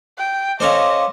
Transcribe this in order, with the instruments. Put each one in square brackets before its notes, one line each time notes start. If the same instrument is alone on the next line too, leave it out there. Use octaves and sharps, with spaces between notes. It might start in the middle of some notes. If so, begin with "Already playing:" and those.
[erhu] G5
[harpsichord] C#4 A4 C5 [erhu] D#5 [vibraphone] F5 C6 D6